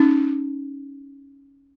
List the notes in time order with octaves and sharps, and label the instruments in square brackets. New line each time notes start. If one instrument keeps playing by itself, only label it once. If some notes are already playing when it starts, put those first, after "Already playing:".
Already playing: [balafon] C#4 D#4